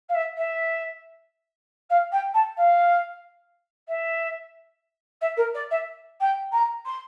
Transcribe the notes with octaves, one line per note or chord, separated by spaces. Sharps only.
F5
E5
E5
F5
G5
A5
F5
E5
E5
A#4
D5
E5
G5
A#5
C6